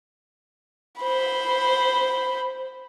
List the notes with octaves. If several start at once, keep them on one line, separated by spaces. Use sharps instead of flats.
C5 B5